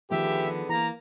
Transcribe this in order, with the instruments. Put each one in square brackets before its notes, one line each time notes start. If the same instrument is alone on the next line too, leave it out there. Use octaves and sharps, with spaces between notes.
[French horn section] D3 B3 G#4 [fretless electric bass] D#3 F3 A3 [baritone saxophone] G4 [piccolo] E5
[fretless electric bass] E3 [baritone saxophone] A#3 [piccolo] A#5